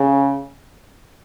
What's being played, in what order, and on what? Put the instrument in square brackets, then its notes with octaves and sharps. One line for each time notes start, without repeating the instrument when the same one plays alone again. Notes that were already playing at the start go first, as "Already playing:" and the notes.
Already playing: [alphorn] C#3